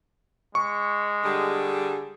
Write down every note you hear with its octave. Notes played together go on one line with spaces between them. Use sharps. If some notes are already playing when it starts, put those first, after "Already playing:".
G#3 C#6
D3 G3 G#4